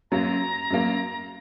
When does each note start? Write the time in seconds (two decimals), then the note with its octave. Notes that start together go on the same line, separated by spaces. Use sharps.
0.11 F#2 F#3 A#3 A#5
0.70 F#2 F#3 A#3